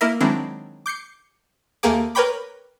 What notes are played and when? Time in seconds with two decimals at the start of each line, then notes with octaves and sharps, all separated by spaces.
0.01 A#3 E4 A#4 D#5 E5
0.21 D#3 F#3 G#3 C4 D4 E4
0.86 D6 G6 C7 C#7
1.83 D#2 A3 A#3 G4 G#4 D6
2.15 A#4 B4 C#5 G5 B5 D6